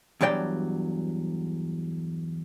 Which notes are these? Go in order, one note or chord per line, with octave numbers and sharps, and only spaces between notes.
E2 G2 F#3 D5 G5